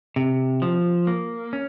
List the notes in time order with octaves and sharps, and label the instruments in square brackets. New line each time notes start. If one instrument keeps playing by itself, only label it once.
[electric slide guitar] C3
F3
A#3
C#4